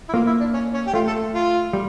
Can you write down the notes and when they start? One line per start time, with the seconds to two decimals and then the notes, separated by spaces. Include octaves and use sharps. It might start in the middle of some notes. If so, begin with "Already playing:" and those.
0.09 E4
0.13 A#3 F4
0.27 E4
0.40 D4
0.53 C#4
0.74 C#4
0.87 G4
0.94 A3 F4
1.07 A4
1.34 F4
1.73 G3